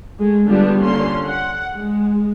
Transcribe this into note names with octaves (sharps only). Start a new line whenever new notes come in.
G#3 A3
D3 G3 B3 D4 F4 G4
D3 A#3 C#4 C6
F#5
G#3